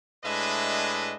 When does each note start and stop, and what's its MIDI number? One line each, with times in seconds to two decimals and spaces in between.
0.24 1.15 45
0.24 1.15 56
0.24 1.15 62
0.24 1.15 71
0.24 1.15 75
0.24 1.15 76